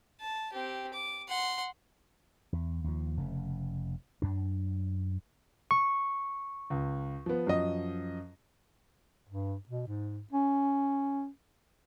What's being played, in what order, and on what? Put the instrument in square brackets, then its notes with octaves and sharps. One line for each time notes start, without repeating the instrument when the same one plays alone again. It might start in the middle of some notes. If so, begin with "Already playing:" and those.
[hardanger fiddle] A5
C4 G4
D6
F#5 C6
[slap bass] E2
D#2 F3
F1 C#3 A3
F#2 D4
[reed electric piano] C#6
[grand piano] C#2
F3 B3
F#2 F3 D#5
[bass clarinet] G2
B2
G#2
C#4